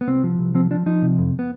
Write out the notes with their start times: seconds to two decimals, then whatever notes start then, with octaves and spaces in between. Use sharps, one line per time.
0.01 B3
0.07 C2 C4
0.24 F3
0.39 C2
0.55 F3 C4
0.71 F3 D4
0.86 F3 D#4
1.02 C3
1.18 F2
1.39 B3